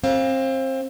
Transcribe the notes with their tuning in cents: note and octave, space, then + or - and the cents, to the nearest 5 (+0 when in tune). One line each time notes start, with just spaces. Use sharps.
C4 +25 F5 +0